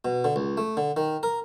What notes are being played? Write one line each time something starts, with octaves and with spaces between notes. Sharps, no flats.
B2
D3
C#2
A3
D3
D#3
A#4